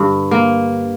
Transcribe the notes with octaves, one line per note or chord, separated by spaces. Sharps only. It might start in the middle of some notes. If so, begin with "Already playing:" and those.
Already playing: G2 D3
A#3